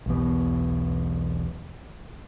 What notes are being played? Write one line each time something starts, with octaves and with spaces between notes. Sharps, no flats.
B1 E2 B3